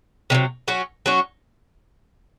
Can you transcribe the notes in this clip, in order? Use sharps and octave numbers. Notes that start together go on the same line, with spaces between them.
C3 D#3 F#3
F#3 C#4 F#4
F#3 C#4 F#4